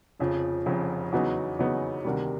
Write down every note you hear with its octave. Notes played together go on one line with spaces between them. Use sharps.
F1 F2 C#3 F3
F1 F2 C#3 F3
E2 C#3 F#3 B3 D#4
E2 C#3 F#3 B3 D#4
D2 C3 D#3 G3